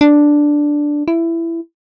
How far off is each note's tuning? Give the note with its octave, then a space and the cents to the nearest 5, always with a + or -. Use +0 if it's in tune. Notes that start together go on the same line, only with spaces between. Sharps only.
D4 +0
E4 +15